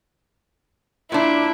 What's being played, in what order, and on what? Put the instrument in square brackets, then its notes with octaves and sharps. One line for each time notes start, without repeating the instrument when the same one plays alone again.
[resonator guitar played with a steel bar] A#2 D4 [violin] E4